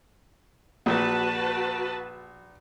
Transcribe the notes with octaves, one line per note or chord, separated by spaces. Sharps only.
A#1 F#4 B4 A5